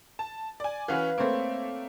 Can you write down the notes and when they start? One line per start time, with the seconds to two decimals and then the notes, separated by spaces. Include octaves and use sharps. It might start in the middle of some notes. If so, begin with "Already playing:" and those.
0.19 A5
0.60 D5 G#5
0.88 E3 C#4 F#4 B4 F5
1.18 A3 A#3 C4 C#5